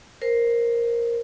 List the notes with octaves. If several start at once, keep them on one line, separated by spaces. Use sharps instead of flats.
A#4 C5